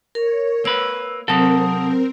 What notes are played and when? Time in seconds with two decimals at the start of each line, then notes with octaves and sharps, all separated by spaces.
0.15 A#4 C#5
0.65 A#3 B4 E6
1.28 C3 F#3 A#3 C4 A4 A#4 D#6